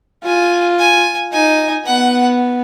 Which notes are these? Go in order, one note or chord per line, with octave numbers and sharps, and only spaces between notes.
F4 G#5
G#5
D#4 G#5
B3 F#5